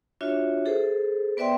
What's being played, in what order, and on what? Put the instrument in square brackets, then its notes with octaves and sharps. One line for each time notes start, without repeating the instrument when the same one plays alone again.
[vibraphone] D4 F4 F#4 C#5 E5
G#4 A4 C5
B3 B4 D5 E5 G5 C6